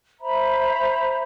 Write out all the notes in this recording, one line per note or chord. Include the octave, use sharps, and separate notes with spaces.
C5 E5 A#5 B5